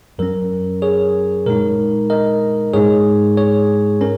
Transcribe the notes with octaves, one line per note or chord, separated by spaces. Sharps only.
F#2 F#3 C#4 A#4
G#4 C#5
A#2 G#3 D#4 A#4
A#4 D#5
G#2 G#3 D#4 G#4 C#5
G#4 C#5
C#4 A#4